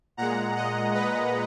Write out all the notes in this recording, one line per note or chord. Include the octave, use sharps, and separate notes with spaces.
A#2 G#3 F#5 A#5
D#5 F#5
B4 D#5